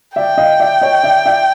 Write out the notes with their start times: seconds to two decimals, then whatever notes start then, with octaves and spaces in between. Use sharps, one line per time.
0.16 D5 E5 G5
0.38 D#5 F5
0.60 D5 E5
0.81 C#5 D#5
1.03 D5 E5
1.25 D5 E5